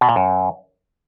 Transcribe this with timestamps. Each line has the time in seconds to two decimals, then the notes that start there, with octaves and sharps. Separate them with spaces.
0.01 B2
0.09 A#2
0.16 F#2